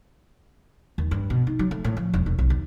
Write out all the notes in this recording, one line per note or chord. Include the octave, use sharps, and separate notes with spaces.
D#2
G2
B2
D#4
F#3
A3
A2
F3
E1
E1
B1
D#2